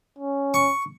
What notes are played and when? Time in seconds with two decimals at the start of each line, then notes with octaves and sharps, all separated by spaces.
0.18 C#4
0.54 C#6